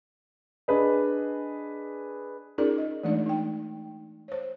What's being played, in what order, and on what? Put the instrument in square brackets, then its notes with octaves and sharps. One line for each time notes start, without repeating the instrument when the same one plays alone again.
[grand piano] D4 G#4 B4 D#5
[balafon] C#4 D#4 F4 G#4 A#4 D5
D#5
E3 G#3 A3 D4 D#4 D5
D#4 G5
C5 C#5